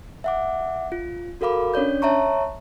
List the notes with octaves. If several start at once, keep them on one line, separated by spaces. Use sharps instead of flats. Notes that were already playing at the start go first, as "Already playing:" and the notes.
E5 F#5 D6
F4
F#4 A4 A#4 F5 B5 D6
C#4 D4 C#5 D5 G6
C#5 E5 A5 A#5 C#6